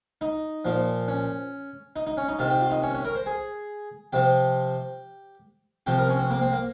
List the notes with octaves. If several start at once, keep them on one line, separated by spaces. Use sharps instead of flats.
D#4
A#2 F3
C#4
D#4
D#4
C#4
D#4
C3 D#3 F4
G4
F4
D#4
C#4
C#4
A#4
C5
G#4
C3 F3 G4
C3 F3 G4
A#4
C#4
C4
A#3
C4
A#3